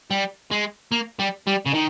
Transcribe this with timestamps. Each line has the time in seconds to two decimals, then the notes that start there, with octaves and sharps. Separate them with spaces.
0.11 G3
0.51 G#3
0.92 A#3
1.19 G3
1.47 G3
1.66 C#3
1.74 D#3